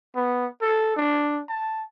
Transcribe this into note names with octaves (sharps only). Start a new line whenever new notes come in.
B3
A4
D4
A5